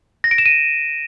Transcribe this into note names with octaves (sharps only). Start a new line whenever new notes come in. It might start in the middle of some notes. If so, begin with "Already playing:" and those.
A#6
D7
E7
D#7